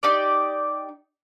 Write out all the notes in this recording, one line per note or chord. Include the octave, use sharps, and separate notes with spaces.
D#4 G4 D5